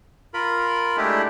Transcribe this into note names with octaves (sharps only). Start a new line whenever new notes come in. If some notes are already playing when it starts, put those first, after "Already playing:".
F4 A#4 B5
G#3 A3 D4 E4 G4